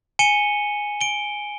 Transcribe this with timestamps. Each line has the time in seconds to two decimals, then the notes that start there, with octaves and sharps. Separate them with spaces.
0.19 G#5 C#7 D#7 E7 G7
1.01 D7 G7